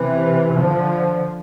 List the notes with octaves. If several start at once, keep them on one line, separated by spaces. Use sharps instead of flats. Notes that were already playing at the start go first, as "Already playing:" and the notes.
Already playing: C3 E3
D3 F3